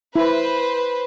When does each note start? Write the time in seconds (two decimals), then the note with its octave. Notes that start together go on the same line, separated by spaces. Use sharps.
0.16 E4 B4 C5